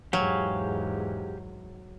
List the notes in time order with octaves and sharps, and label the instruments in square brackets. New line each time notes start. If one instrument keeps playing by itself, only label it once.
[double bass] E2 G#2 [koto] F#3 [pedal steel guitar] G4 F5 G#5